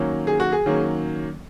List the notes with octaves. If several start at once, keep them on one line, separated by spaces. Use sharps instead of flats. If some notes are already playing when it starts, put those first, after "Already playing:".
Already playing: D#3 F#3 A#3 C#4
G#4
F#4
G#4
D#3 F#3 A#3 C#4